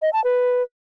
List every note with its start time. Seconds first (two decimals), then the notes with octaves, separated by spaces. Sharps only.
0.02 D#5
0.13 A5
0.24 B4